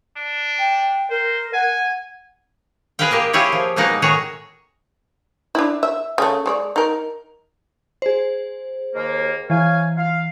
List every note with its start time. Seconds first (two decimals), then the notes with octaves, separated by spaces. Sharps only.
0.16 D4
0.59 G5
1.10 A#4 C5
1.53 F#5 G#5
2.99 G#4 B4 D#5 F5 G5
3.11 A#3 G4 A#4 D#5
3.33 E4 F4 G4 G#4 C#5
3.52 F3
3.76 B2 G#3 A#3 D#4 D#5 F#5
4.02 A2 D#3 F#4 G#4 C#5 A#5
5.55 D4 E4
5.83 E5
6.18 C#3 A3
6.46 G#3 C#5 D5
6.76 D#4 A#4
8.02 G#4 C5
8.95 D#2 A#3
9.50 E3 C#5 F5 G#5
9.98 F5